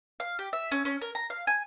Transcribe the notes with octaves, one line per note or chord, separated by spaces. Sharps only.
F5
G4
E5
C#4
C#4
A#4
A#5
F5
G#5